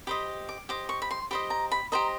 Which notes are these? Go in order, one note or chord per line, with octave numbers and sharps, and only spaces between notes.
G4 C5 D#5 B5
D6
G4 C5 D#5 D6
C#6
B5
C6
G4 C5 D#5 B5
A#5
B5
G4 C5 D#5 A#5